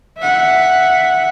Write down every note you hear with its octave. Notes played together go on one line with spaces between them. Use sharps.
E5 F#5